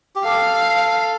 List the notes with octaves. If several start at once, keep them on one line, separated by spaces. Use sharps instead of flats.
G4
A4 F5